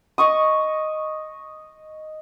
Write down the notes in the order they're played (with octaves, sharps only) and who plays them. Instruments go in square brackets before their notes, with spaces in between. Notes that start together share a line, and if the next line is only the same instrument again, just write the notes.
[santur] D#5 C#6 D#6